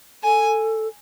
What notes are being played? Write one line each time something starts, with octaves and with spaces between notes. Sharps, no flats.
A4 G#5